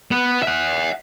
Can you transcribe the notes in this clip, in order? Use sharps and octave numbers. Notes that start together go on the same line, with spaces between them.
B3
E5 F#5